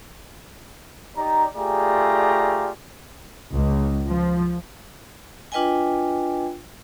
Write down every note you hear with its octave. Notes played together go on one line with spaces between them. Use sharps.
D#4 G4 D5 A#5
A3 F4 G4 G#4 D5 A#5
C#2
F3
D4 F4 B4 D#5 G5 G#5